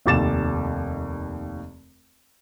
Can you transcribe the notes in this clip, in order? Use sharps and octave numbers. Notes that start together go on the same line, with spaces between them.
F1 D#2 D6 A6 E7